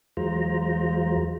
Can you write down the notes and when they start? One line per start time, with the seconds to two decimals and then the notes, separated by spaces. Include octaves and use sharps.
0.17 E2 F#3 G#3 F4 C5 A#5